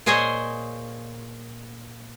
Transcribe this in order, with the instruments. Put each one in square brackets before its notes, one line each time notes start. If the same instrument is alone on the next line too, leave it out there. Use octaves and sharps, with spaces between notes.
[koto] A#2 G#4 C5 C#5 D#5 G#5